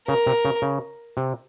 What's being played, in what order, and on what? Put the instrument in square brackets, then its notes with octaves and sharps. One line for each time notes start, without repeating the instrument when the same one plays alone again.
[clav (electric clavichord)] C#3 [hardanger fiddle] A#4
[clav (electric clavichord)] C3
C#3
C#3
C3